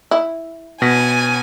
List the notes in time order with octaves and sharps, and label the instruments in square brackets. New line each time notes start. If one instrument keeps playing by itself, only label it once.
[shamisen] E4
[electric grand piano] B2 A#6 B6 [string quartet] G#5